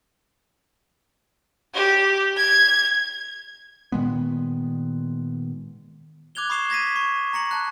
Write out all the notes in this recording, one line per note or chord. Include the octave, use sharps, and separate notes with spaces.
G4
G#6
A#2 D#3 G#3 B3
D6 F#6 G#6 F7 G7
B5 C#6 D#6 C7 E7 G7
G#6 A#6 B6 D#7
C#6
A#5 A#6 C#7 F#7
A5 F#6